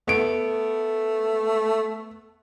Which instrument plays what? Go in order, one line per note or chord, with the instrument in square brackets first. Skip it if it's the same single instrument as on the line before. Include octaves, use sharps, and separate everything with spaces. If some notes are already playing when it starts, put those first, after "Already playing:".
[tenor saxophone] A3 [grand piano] B3 D7